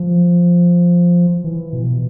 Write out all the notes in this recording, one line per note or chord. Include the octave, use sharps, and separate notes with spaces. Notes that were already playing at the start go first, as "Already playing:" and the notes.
Already playing: F3
E3
B2